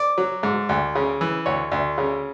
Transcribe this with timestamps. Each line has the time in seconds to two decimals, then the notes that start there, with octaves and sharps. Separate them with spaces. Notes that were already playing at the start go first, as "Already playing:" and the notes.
Already playing: D5
0.18 F#3
0.43 G#2
0.69 D2
0.95 C#3
1.21 E3
1.46 D2 C#5
1.72 D2
1.98 C#3